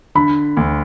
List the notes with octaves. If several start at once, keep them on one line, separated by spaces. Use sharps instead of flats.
D3 B5
D2